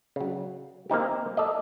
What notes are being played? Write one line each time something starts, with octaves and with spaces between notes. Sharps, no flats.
C#3 F#3
A#3 C4 D#4 G4
A4 D5 D#5